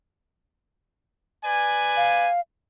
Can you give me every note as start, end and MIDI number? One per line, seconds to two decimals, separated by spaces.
1.45 2.29 71
1.45 2.29 74
1.45 2.29 80
1.97 2.40 77